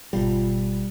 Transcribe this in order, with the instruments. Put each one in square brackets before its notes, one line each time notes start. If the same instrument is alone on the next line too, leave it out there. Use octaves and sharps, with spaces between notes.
[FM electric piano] G#1 B2 F4 [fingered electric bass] G3